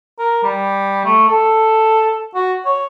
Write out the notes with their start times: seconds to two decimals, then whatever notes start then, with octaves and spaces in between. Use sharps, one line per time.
0.19 A#4
0.43 G3
1.05 A3
1.28 A4
2.35 F#4
2.65 C#5